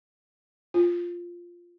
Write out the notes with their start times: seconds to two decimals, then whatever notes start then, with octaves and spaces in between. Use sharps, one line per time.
0.74 F4